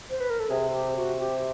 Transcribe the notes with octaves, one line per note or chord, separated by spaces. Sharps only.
C5
B4
A#4
A4
C3 G#4
G4
C3 F#4
G4